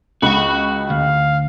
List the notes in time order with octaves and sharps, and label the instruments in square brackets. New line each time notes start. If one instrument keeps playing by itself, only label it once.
[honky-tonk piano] C#2 B5 [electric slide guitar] F#4 F#5
[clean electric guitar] D2 [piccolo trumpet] F5